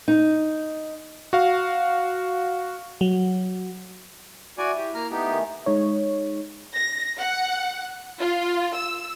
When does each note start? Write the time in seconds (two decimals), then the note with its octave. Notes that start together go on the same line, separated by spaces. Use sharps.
0.08 D#4
1.33 F#4 F5
3.01 F#3
4.58 E4 F#4 D5 G#5
4.77 G4
4.94 A#3 A#5 F6
5.11 A3 B3 D#4 G4
5.30 D#3 A3 G#5
5.66 G#3 D#4 C#5
6.74 A#6
7.18 F#5
8.19 F4
8.76 E6